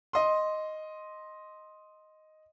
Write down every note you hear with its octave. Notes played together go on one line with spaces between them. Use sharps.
D#5 C6